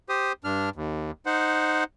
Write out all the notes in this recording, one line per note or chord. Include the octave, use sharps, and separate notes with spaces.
G4 C5 D#6
G2 D4 F6
D#2
D#4 C5 F#5